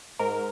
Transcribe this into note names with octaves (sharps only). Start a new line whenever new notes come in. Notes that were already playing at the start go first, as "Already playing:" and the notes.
G#2 A#4